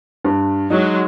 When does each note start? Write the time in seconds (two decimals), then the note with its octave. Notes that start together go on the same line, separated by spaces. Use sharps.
0.25 G2
0.70 F#3 G#3 D#4